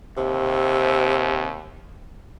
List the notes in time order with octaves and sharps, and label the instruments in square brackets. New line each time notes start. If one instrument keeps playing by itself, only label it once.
[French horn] D#2 [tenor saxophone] C3